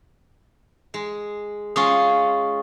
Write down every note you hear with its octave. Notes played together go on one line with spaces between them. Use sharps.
G#3
G#3 C#4 F4 C#6 D#6